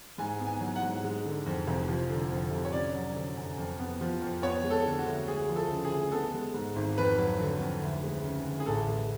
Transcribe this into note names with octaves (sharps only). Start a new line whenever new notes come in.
G#2 G#5
B3
G#5
F#3
F#5
G#2
G#3
D3
F2
F1
F3
D3
F2
F1
C#5
C#4 D5
F#3
D3
F#2
F2
B3
F3
F2
B3 C#5
G#3
A4
D3
F#4
D2
G#3 G#4
F3
A4
C#3
G#4
D2
B3 A4
G#3
G#2
G#1
F2 B4
F#3
D3
F2
D2
G#3
C#3
D2
G#4
A1 A4
G#3